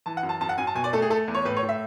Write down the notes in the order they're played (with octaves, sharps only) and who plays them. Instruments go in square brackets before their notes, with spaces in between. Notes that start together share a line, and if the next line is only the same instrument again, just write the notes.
[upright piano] E3 A5
F#5
F#2
A5
F#2 A5
F#5
F#2 G#5
A5
B2 G#5
D5
A3 A4
G#4
A3 A4
E2
C#5
A2 B4
C#5
A2
E5